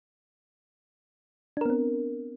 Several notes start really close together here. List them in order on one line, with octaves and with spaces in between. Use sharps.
D4 A#4 B3 C4